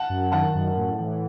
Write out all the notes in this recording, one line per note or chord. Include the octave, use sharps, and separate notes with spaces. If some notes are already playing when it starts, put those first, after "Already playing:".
Already playing: F#5 A5
F#2
D#3 F#5 A5
F#2
A2
E3